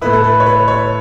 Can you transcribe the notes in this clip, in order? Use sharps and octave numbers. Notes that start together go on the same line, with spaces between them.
A2 A3 E4 B4
A4
B4
C#5
B4
C#5